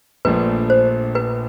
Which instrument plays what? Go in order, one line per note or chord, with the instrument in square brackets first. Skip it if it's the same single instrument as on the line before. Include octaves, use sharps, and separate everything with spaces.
[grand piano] A#1 A#2 F3 A3 D4 [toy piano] B4
[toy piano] C5
B4